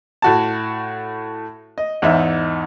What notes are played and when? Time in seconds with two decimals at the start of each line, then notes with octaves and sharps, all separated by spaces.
0.22 A2 F#4 A5
1.78 D#5
2.02 E2 G#2 D#4 E5